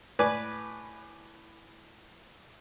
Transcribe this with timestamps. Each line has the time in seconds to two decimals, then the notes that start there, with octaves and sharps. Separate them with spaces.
0.19 A2 B4 D5 G#5